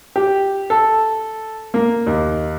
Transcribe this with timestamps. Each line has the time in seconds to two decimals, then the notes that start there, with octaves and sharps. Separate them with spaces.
0.16 G4
0.70 A4
1.74 A#3
2.07 D#2